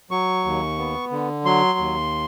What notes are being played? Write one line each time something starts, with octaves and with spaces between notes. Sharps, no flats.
F#3 C#6
D#2
B3
D3
F#3 C6
D#2